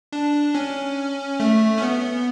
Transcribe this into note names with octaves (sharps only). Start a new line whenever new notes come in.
D4
C#4
A3
C#4
B3